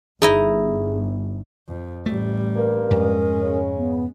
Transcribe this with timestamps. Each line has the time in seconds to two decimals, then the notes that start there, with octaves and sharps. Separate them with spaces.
0.22 G1 D#4 E4 G#4 D#5
1.68 F2
2.06 A1 G3 A3
2.55 G2 A#3 A#4
2.90 F2 G#2 G#3 C#4
3.41 C#3
3.78 B3